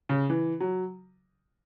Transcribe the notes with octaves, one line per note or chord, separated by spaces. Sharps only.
C#3
E3
F#3